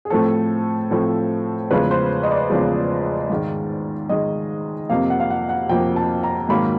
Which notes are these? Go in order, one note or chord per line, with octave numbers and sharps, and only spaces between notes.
G#4
A2 F3 A3 C4 A4
A2 F3 A3 C4
E2 C#3 F3 G#3 B4
C5
D#5
D5
E2 C#3 F3 G#3
G#2 D#3 G#3
G#2 D#3 G#3 D#5
F2 C3 F3 A#3 F5
F#5
F5
F#5
F#5
F2 C3 F3 A#3 G5
A5
A#5
G#2 D#3 F#3 A#3 B5